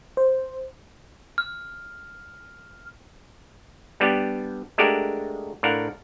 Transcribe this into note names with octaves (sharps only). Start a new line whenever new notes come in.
C5
F6
G3 B3 D4 G4
G#3 A3 D4 F#4 G4 A#4
A2 D4 A#4 F5 F#5